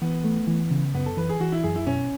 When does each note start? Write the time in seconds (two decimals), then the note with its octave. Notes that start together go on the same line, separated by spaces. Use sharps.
0.02 E3 B3
0.24 A3
0.47 E3
0.71 C#3
0.94 F#2 B3
1.06 A4
1.17 E3 B4
1.29 G#4
1.40 E3 F#4
1.52 E4
1.63 F#2 G#4
1.76 E4
1.87 B2 C#4